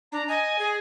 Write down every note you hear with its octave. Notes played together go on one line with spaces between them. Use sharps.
D4 A#5
D#5 G#5
G#4